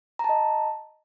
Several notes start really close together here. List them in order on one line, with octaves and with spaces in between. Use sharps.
A#5 A5 D#5